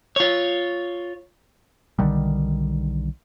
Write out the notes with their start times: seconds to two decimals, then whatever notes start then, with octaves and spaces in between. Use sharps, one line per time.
0.16 F4 C#5
1.99 B1 D3 D#3 G3